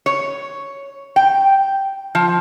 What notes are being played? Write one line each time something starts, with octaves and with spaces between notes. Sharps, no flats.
C#5
G5
F3